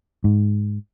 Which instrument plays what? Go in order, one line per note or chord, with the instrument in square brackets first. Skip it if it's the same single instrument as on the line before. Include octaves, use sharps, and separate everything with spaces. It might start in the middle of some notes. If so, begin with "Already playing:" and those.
[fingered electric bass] G#2